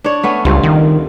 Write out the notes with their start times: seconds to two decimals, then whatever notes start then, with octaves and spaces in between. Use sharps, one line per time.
0.04 D4 C#5
0.23 A3 B3 C#4
0.45 C#2 G2 C4 F4
0.63 D#3